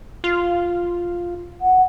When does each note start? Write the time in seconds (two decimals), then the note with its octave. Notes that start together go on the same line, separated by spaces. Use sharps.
0.24 F4
1.61 F#5